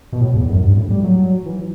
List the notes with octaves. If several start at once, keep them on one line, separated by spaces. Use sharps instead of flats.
B2
A2
E2
F#2
G2
A2
G3
F#3
E3